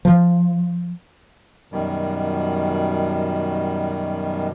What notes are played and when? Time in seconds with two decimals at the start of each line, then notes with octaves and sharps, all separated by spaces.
0.05 F3
1.72 F#2 B2 D#3 G3